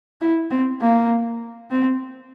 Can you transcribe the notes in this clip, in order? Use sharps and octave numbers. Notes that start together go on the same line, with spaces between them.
E4
C4
A#3
C4